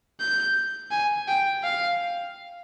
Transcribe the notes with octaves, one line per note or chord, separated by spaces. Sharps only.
G6
G#5
G5
F5